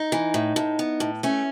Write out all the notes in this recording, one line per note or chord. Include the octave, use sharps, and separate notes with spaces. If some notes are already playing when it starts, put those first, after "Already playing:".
Already playing: D#4
E3
A2
A2
B3
A2
A3 C#4